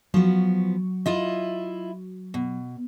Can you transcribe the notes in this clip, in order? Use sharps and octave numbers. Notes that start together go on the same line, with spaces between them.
F3 F#3 B3 F#4
E4 F4 D#5
B2